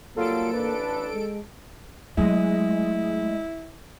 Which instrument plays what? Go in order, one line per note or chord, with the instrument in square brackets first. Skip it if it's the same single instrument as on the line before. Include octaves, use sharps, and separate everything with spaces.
[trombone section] F#3 G3 F4 [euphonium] A#3 [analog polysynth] A4 D7
[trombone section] A1 D4 B4
[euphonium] G#3
[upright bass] F#3 A3 [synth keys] G#3 D#5 [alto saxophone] E4